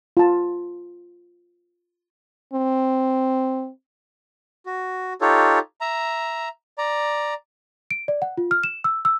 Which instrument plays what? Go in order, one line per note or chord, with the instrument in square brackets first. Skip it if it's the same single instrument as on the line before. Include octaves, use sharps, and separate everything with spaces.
[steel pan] F4 A5
[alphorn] C4
[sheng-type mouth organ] F#4
D#4 F4 G4 A4 C#5
E5 A#5
D5 A#5
[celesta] D7
D5
F#5
F4
F6
E7
E6
E6